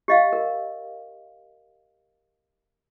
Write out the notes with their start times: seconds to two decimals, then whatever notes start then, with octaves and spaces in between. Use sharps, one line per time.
0.08 G4 D#5 F5
0.33 A#4